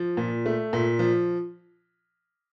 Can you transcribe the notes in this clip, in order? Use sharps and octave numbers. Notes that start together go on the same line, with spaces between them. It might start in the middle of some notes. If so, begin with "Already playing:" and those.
Already playing: F3
A#2
A3
A#2
F3